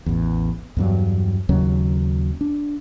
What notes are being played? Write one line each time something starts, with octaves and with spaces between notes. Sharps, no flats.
A1 E2
E2 G2 F#3
D#2 C#3 F#3 C#4
D4